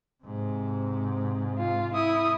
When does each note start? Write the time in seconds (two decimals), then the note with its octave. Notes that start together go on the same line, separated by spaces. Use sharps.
0.23 G#2 C3
1.59 F4
1.94 E4 D#6